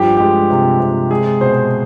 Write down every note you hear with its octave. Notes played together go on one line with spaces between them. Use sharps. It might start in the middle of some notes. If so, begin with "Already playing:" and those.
Already playing: G2 F3 G4
G#3 G4
C3
C3
G#3 G#4
B2 C5